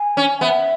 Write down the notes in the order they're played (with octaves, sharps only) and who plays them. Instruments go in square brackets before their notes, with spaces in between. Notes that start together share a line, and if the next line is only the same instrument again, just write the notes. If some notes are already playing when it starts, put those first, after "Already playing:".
Already playing: [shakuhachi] G#5
[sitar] C#4
[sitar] B3 [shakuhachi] E5